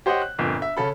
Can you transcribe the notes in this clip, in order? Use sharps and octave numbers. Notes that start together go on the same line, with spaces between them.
G4 C5 C#5 D#5 F#5
F#6
G1 F2 A#2
E5
C#3 C#4 A4 B5